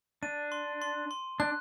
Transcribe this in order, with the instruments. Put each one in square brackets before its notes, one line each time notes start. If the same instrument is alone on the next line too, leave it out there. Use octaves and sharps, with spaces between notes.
[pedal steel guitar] D4 [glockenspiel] D#7
[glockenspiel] C6
C6
C6
[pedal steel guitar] D4 [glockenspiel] F#6